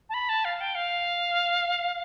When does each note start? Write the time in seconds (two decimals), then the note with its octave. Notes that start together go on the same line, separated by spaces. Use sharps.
0.09 A5
0.14 B5
0.29 A5
0.45 F5
0.60 G5
0.75 F5